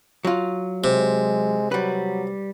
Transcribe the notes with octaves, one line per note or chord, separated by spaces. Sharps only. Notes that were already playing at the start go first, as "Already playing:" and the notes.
F#3 F4
C3 G#3
F#3 G3 B4